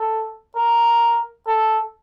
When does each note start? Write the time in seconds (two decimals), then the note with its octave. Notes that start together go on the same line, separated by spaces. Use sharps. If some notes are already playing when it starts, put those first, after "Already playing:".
Already playing: A4
0.55 A#4
1.46 A4